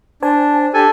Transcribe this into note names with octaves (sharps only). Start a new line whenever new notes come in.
D4 C5 G#5 A5
D4 G4 A4 G#5